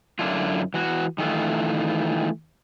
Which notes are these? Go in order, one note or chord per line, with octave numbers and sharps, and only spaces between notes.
F#2 D3 D4 E4 F4
E3 F#4
D#3 E3 A3 F4